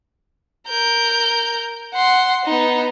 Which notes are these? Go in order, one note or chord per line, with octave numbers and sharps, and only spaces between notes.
A#4 G6
F#5 C6
B3 D#4